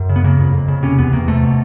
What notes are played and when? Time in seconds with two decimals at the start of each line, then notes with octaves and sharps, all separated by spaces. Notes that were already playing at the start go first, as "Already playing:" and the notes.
Already playing: F#2
0.09 C#3
0.16 B3
0.24 C#3 A#3
0.39 F2
0.54 F2
0.68 C#3
0.83 C3 C#4
0.98 E2 B3
1.13 E2 A#3
1.28 C3 A3
1.44 B2